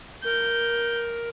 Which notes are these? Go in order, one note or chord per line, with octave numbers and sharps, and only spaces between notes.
A#4 G6